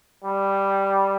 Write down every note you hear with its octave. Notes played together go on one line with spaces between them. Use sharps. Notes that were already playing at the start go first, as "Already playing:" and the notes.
G3